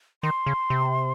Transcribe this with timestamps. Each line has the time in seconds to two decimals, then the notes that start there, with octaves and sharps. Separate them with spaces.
0.23 D#3 C6
0.46 C#3
0.70 C3